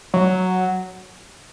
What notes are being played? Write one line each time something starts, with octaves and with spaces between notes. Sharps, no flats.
F#3